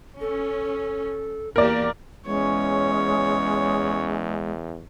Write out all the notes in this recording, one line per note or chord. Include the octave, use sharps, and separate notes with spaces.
C#4 A4
E2 A#3 G4 A#4 D5
E2 G#3 C#4 C#5